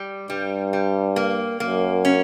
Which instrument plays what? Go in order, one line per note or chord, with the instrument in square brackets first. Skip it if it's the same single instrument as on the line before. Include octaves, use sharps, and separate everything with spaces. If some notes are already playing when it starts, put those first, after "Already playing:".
Already playing: [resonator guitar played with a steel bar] G3
[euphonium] G2 [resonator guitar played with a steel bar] G3
[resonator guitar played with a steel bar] G3
A#3
[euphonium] F#2 [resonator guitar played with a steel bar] A#3
[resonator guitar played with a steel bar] C#4